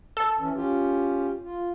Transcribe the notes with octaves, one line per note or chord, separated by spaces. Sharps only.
A4
E3 C#4
C#4 F4 G4
F4